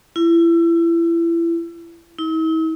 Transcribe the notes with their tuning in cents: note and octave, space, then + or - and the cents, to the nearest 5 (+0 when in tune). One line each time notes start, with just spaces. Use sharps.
E4 +30
E4 -45